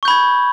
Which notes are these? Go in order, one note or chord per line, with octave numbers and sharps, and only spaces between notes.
B5 C#6 G6 G#6